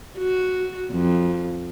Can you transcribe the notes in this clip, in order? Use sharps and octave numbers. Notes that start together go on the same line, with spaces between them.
F#4
F2